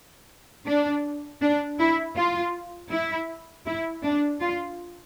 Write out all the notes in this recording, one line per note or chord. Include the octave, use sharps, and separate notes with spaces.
D4
D4
E4
F4
E4
E4
D4
F4